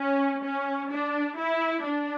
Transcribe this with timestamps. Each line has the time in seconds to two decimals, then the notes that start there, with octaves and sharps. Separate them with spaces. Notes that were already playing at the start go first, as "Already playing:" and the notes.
Already playing: C#4
0.42 C#4
0.89 D4
1.37 E4
1.84 D4